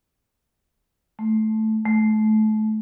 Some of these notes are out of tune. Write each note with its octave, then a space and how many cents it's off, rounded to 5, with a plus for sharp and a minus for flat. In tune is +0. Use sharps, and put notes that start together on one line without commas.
A3 -10
A3 -30